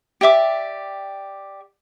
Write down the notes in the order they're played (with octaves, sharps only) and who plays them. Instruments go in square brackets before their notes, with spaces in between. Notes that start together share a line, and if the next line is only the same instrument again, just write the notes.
[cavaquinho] G4 D5 E5 D6